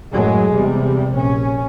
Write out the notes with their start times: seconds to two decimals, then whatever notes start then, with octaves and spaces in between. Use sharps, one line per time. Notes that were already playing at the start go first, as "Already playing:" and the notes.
0.11 F#2 A2 F#3 G#3
0.54 E2 C3 G3
1.14 A#1 C#4